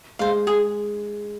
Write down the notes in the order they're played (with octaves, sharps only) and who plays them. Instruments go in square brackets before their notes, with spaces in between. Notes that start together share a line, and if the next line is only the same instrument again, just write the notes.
[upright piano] G#3 [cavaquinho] C5 F5
[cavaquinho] G#4